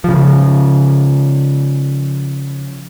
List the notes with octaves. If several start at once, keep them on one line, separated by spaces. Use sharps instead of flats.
C#3 F3